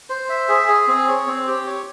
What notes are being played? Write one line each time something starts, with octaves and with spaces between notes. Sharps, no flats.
C5
E5
G#4
G#4
C4
C#5
C4
G4
C#5